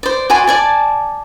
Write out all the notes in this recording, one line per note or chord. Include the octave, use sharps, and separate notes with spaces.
C5 D5
F#4 D5 G#5 C6
D5 G#5 A5